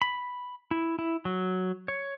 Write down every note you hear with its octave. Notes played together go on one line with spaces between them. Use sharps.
B5
E4
E4
F#3
C#5